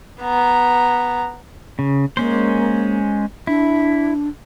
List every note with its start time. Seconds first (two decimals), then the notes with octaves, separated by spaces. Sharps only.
0.22 B3 A#5
1.79 C#3
2.17 G#3 A#3 C#4 C5
3.47 D4 E4